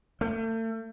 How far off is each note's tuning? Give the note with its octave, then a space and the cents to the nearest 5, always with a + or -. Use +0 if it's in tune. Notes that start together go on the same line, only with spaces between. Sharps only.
A3 +40